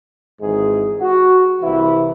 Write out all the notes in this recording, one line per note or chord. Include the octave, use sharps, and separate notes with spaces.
G#1 G#2 E3 G#3 G#4
F#4
C2 C3 E3 E4